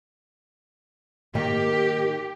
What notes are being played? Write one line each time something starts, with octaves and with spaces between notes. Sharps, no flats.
D#3 A#3 D#4 G4